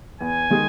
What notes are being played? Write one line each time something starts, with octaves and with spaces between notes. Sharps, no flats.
E2 G#5
D#3 G#3 D#4 G#4